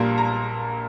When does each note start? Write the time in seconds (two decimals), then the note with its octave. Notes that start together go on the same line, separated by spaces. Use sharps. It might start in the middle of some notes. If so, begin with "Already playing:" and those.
Already playing: A#1 A#2 G3 A#3 C6
0.18 A#5